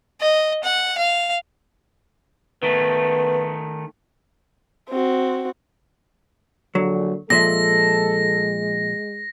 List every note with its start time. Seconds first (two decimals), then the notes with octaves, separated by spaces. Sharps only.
0.20 D#5
0.63 F#5
0.97 F5
2.63 D#3 A3 B3
4.90 C4 F#4
6.75 A#1 D3 F#3
7.30 A#2 F3 G#3 A4 E5 A#6